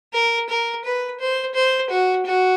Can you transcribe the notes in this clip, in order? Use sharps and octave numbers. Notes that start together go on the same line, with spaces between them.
A#4
A#4
B4
C5
C5
F#4
F#4